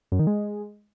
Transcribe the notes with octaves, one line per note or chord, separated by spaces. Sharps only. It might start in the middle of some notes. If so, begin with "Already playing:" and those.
F#2
D#3
G#3